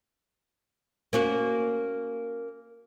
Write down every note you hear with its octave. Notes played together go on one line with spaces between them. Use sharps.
A#3 C#4 F#4